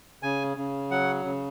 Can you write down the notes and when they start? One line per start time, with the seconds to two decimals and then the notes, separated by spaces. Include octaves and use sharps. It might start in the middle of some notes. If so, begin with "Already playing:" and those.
0.23 C#3 G#5
0.57 C#3
0.91 F#3 F#5
1.25 C#3